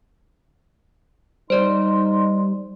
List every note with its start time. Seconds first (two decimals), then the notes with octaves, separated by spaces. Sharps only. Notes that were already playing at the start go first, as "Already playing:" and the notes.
1.50 G3 D#4 C5 D5 C6